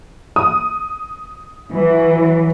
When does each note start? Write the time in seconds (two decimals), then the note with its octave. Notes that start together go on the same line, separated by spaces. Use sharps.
0.36 D#6
1.70 E3 F#3